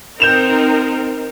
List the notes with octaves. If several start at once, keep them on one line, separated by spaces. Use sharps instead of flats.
C4 D#4 A#4 G6 E7 F7